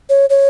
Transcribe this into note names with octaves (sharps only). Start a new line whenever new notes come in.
C#5
C#5